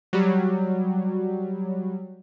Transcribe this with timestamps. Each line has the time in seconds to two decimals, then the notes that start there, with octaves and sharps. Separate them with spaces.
0.13 F#3 G3